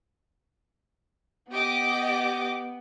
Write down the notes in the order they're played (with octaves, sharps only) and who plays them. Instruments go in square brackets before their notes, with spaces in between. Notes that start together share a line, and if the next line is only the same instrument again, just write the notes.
[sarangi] B3 [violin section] G4 D#5 D6